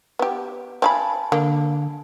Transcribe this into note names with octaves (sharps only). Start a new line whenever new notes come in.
B3 G4
C4 F5 G#5 A5 B5
D3 A#3